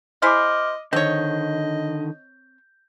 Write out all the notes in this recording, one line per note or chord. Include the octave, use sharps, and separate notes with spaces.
E4 G#4 C5 D#5 D6 F6
D3 D#3 C4 C#5 D#5 G6